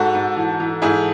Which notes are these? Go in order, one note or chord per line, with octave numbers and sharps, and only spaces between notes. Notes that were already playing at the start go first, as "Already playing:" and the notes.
Already playing: G#2 F#4 A4
G#2
E3
E3
G#2 E4 G#4